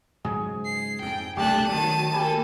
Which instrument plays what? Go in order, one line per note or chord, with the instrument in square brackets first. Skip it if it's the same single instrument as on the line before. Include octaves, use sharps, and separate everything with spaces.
[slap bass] G#2 C#3 F#3 [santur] G#4
[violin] C7
[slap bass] F2 G#2 [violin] G5
[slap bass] F#1 C2 B2 [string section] A3 D4 [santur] G4 [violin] A5 F#6
[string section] D#3 F#3 [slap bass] A3 [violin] A5 D#7
[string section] A#3 A4 [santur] G4 G#5 B5